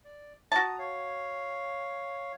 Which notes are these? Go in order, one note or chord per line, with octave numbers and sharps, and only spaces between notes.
D5
F#4 A5 A#5 D#6
C#5 F5